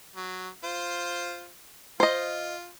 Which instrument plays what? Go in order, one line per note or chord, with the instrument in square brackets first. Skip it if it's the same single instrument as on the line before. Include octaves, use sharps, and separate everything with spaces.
[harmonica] F#3
F4 C5
[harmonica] F4 [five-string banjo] C5 D#5